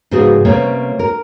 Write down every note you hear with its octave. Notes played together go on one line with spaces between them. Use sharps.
G#2 C#3 F3 B3 F#4 G#4
C3 G3 A#3 B3 C#4 C#5
A#4